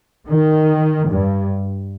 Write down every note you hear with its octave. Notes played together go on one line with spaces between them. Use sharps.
D#3
G2